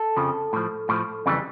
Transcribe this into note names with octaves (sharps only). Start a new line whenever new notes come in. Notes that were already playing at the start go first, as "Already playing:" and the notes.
Already playing: A4
F2 C#3 F3
A2 F3
A2 F3
F2 C#3 E3 G3